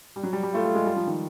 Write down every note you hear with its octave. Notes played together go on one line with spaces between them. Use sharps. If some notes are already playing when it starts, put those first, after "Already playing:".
G3
F#3
G3
G3
A3 F4
A3
G#3
G3
F3
D#3